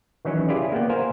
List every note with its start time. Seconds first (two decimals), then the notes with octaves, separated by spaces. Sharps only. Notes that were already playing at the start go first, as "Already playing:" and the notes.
0.25 D#3 E3 F#3 C#4
0.49 E4 F4 G4 G#4 D5
0.72 A#3 B3 G5
0.89 A#4 C5 F5 G#5